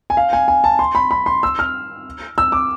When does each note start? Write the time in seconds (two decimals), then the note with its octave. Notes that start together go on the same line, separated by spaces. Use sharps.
0.10 G#5
0.17 F5
0.33 G#5
0.48 G#5
0.64 A5
0.79 C6
0.95 B5
1.11 B5
1.26 C6
1.43 E6
1.59 F6
2.38 E6
2.52 D6